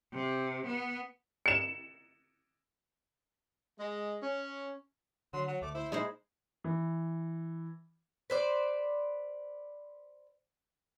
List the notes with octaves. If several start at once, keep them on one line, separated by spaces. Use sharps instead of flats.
C3
B3
C#7 E7
G#3
C#4
D3 F#3 C6
F#3 F#5
D2 A3 D6
E4 C5
A#2 G#3 D#4 C5 B5
E3
B4 C5 D5